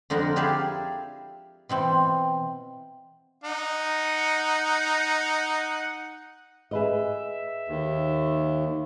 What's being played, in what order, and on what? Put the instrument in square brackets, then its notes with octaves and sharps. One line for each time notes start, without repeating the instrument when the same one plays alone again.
[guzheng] F2 D3 D#4 A#4 F#5
E4 G4 G#4 D5 E5 F5
B2 E3 C4
[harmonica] D#4 F#5
[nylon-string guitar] G#4 B4 D#5 [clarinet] E5
[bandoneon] D#2